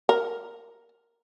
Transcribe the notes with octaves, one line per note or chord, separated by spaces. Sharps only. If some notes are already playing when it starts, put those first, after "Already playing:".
A#4